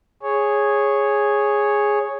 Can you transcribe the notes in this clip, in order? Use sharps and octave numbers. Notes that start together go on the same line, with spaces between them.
G#4 C#5